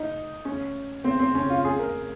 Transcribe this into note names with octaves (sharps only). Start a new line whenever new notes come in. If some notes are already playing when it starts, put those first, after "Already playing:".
Already playing: D#4
C#4
C4
C4
C#4
F4
G#4
A#4